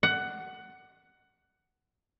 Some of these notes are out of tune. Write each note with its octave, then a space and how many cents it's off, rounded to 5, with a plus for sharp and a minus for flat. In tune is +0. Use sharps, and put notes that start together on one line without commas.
F#5 +15